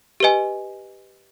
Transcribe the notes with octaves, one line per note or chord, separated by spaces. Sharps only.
G4 B4 D#5 G#5